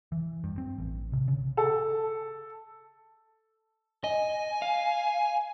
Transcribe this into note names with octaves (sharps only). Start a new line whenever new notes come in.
E3
G2
C4
A1
C3
C#3
A4
D#5 G#5
F5